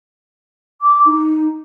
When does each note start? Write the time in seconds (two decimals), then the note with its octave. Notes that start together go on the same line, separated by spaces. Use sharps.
0.81 D6
1.05 D#4